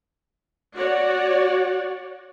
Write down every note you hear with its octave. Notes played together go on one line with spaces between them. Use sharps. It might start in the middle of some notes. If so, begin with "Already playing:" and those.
F#4 C#5 D5 F#5